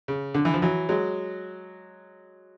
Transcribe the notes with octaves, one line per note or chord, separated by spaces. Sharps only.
C#3
D3
E3
F3
E3 F#3
F#3 G#3